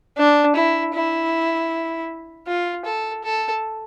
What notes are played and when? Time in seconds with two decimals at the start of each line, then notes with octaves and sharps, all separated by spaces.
0.18 D4
0.56 E4
0.94 E4
2.47 F4
2.85 A4
3.24 A4